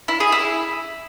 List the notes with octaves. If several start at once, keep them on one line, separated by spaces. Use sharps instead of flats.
E4
G#4
E4